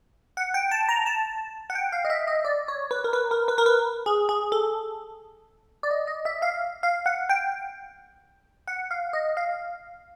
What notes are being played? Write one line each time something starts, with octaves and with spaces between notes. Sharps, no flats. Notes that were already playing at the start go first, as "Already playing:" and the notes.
F#5
G5
A5
A#5
A5
F#5
G5
F5
D#5
E5
D#5
D5
C#5
B4
A#4
B4
A#4
B4
A#4
B4
G#4
G#4
A4
D5
D#5
D#5
E5
F5
F5
F#5
G5
F#5
F5
D#5
F5